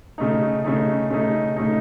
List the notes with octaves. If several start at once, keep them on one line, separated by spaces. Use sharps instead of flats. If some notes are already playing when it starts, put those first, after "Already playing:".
C#3 A3 D#4
C#3 A3 D#4
C#3 A3 D#4
C#3 A3 D#4